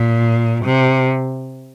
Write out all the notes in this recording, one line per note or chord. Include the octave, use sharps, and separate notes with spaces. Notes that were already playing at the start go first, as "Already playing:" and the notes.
Already playing: A#2
C3